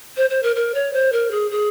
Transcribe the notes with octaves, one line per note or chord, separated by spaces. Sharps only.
C5
C5
A#4
A#4
C#5
C5
A#4
G#4
G#4